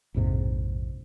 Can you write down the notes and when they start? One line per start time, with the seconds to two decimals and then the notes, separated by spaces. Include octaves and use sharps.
0.14 A#1 F2 G#2 C3